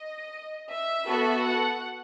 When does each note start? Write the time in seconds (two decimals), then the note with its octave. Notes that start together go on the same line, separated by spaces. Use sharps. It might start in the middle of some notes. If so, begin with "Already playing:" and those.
Already playing: D#5
0.70 E5
1.07 B3 F#4 A4
1.42 F#5